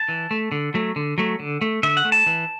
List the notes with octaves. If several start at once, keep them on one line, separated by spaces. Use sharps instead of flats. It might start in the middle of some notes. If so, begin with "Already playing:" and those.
Already playing: A5
E3
A3
D3
F#3 A3
D3
F#3 A3
D3
A3
D3 E5
F#5
A3
A5
E3